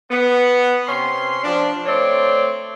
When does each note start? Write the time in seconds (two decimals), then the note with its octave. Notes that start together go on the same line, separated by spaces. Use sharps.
0.11 B3
0.88 C3 C#4 C6
1.44 F3 D4
1.86 A3 C4 C#5 D5